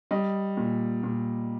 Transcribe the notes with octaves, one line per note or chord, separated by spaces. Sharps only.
G3 D#5
A#2
A#2